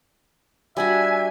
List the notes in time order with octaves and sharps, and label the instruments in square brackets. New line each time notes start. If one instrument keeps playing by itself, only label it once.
[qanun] G3 D4 F#4 [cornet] E5 [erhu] G#5